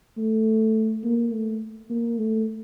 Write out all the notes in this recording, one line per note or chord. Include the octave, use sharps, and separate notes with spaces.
A3
A#3
A3
A#3
A3